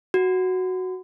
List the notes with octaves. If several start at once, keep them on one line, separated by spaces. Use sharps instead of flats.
F#4